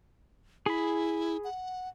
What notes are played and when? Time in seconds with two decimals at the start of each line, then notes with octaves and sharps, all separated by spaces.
0.66 E4 G#4 B5
1.44 F#5